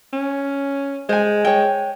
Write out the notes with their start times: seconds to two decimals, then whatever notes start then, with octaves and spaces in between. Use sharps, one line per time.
0.13 C#4
1.09 G#3 C5 G#5
1.45 C#5 G5